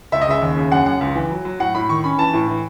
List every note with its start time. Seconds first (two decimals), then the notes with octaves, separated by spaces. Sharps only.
0.12 C#2 E5
0.21 D#5
0.27 C#3 E5
0.42 D#2
0.57 C#3
0.72 F#2 F#5
0.86 F#2 F#5
1.01 C#2
1.15 E3
1.31 F#3
1.45 F#3
1.59 A2 F#5
1.75 A2 B5
1.89 D#3 C#6
2.04 C#4 B5
2.18 E3 A5
2.33 A2
2.48 E3